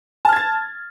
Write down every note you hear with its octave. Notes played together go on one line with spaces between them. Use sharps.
A5 F6 G#6 A6